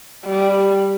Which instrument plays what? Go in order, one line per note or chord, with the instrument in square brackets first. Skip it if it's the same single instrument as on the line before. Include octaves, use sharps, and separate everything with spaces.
[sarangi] G3